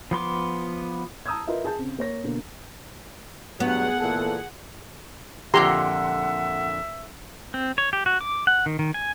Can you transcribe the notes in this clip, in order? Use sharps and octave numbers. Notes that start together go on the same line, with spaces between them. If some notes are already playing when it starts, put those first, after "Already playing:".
F3 B3 C6 D6
A5 A#5 D#6 E6 G6 G#6
F4 A#4 B4 D#5 E5
G#4 A5 G6
C#3 C4
A#3 C#5 A#6
B2 D3 A#3
G2 F#3 B3 G#4 F#5
A#2 E3 A4
F2 A#2 D3 G4 E5 F#5 A#5 C6
C4
C#5
G4
F#4
D6
F#5
D#3
D#3
G#5